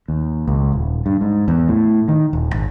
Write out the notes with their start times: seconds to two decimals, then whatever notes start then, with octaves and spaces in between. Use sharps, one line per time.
0.08 D#2
0.48 C#2
0.73 D#1
1.06 G2
1.21 G#2
1.48 E2
1.68 A2
2.08 D#3
2.33 D#1
2.54 G#1